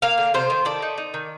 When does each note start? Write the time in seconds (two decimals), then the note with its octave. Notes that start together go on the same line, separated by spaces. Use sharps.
0.02 A#3 F5
0.18 D3
0.34 C3 C5
0.50 D#3
0.65 A3 D5
0.82 D#4
0.98 D#4
1.14 D#3